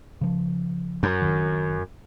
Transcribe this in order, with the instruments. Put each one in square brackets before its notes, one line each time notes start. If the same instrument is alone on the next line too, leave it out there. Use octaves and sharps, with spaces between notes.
[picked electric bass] C#3 F3
[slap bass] F#2
[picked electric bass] F#1 C2 D#3